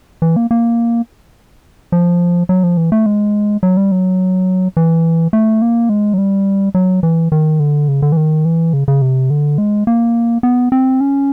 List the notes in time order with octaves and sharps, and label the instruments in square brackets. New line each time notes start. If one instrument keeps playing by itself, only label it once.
[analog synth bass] E3
A#3
A#3
F3
F#3
F3
E3
A3
G#3
F#3
G3
F#3
E3
A3
A#3
G#3
F#3
G3
F#3
E3
D#3
D3
C#3
D3
E3
D#3
E3
C#3
C#3
C3
D3
G#3
A#3
B3
C4
C#4